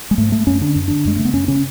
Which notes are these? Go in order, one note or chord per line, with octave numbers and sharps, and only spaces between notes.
G#3
G#2 A3
A3
F#2 C#4
D3 D4
F#2
D3 D4
F#2 G#3
C#3 A3
B3
F#2 C#4
C#3 C#4